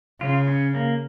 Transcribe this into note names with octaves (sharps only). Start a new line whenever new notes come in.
C#3 F4
C#4
A#3